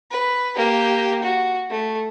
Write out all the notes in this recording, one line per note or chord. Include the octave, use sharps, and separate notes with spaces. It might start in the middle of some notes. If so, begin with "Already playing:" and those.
B4
A#3 G4
F#4
A3